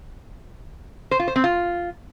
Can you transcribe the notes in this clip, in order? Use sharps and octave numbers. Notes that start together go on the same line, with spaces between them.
C5
F4
C5
C4
F4